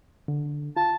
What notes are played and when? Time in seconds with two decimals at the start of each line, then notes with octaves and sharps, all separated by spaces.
0.28 D3
0.76 F4 A5